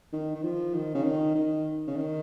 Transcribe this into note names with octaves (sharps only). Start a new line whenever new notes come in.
D#3
D#3
F3
D#3
C#3
D#3
D#3
C#3
D#3